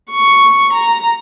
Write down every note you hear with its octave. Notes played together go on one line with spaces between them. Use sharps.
C#6
A#5